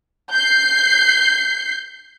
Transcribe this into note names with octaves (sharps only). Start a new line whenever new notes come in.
G6 C7